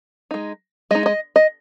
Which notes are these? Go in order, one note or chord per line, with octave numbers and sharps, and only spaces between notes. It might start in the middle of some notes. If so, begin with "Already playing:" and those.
G#3 D#4
G#3 D#4 D#5
D#5
D#5